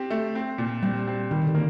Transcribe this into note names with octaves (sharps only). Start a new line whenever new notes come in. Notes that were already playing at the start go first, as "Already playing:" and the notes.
Already playing: C4 G4
A3
C4
A#2
G3 C4
C4
D#3 G3
D#3
D3
A#3